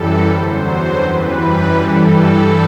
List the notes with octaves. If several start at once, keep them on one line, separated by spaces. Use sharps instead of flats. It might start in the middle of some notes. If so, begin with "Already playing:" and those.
Already playing: F#2 E3 G3 A4
E2 D3 F#3 C5
F#2 E3 G3 B4
G2 E3 G3 A4